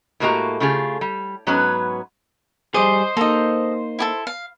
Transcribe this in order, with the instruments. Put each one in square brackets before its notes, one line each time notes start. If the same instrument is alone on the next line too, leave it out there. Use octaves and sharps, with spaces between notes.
[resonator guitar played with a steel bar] A2 G#3 A#3 F#4 G4 A#5
C#3 A3 F4 G4 G#4
G3
G#2 F#3 B3 C#4 B4
[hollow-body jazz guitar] G3 G#4 [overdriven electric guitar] C5 [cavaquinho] D#5 D6
[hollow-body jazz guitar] A#3 D#4 [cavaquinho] A4 D#5
[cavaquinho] E4 G4 A4
F5